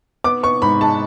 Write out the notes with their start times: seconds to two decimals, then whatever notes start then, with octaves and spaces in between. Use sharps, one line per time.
0.24 B3 D6
0.43 B3 C#6
0.62 G#2 B5
0.81 G#3 A5